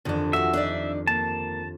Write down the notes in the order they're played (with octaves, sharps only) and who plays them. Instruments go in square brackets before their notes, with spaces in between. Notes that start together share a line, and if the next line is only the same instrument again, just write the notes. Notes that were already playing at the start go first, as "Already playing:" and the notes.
[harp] G1 F2 D#3 [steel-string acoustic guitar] D3 D4
[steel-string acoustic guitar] F3 F#4 [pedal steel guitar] E5
[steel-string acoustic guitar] D4 D#4 D5
[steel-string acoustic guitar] A#3 [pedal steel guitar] A5